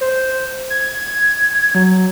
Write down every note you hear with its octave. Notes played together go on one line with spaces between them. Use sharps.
C5
G#6
F#3